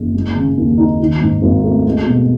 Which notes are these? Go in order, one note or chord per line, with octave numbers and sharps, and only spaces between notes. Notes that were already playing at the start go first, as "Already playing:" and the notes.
Already playing: F#1
G#3
C#3
D#2
D#4
D#3
G#2
G#1
A3
G#3
B2